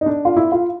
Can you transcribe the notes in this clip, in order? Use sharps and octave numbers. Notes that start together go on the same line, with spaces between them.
D#4
D4
F4
E4
F4